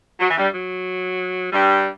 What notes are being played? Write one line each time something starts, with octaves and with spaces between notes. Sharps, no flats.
F#3
E3
G2 G3
F#3
G2 G3